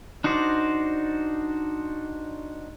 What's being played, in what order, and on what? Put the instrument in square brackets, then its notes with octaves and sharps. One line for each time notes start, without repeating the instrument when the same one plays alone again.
[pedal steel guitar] D4 D#4 F#4 C5 D5